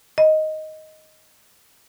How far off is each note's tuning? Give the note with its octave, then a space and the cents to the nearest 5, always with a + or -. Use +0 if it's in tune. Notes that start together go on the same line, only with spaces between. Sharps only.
D#5 +5